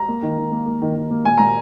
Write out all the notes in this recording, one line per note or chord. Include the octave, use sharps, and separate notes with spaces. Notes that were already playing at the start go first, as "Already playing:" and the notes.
Already playing: A#5
A#3
D#3
D#3
A#3
A#3
D#3
D#3
A#3
A#2 G#5
A#2 A#5